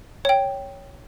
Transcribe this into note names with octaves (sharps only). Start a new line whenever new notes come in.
C#5 G5